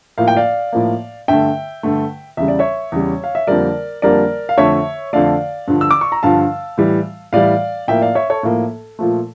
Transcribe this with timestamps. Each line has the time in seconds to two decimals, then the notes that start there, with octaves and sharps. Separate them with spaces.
0.18 A2 F3 A#3 F5
0.28 G5
0.37 D5 F5
0.73 A2 F3 A#3
1.28 G2 D3 A3 E5 G5
1.83 G2 D3 A3
2.37 E2 C#3 G3 E5
2.48 D5
2.59 C#5 E5
2.92 E2 C#3 G3
3.24 F5
3.35 E5
3.47 F2 D3 G3 A#3 A#4 D5
4.02 F2 D3 G3 A#3 A#4 D5
4.49 F5
4.57 F2 D3 A3 C#5 E5
5.13 F2 D3 A3 D5 F5
5.68 G2 D3 F3
5.81 E6
5.91 D6
6.01 C#6
6.12 A#5
6.23 G2 D3 F3 F5 A5
6.78 A2 E3 G3
7.33 A2 E3 G3 D5 F5
7.88 A2 F3 A#3 E5 G5
8.01 D5 F5
8.15 C#5 E5
8.30 A4 C#5
8.43 A2 F3 A#3 A4
8.99 A#2 F3 A3